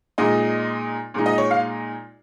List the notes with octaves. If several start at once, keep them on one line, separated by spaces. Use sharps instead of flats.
A#2 G#3 D#4 D#5
A#2 G#3 D#4
D#5
C#5
F5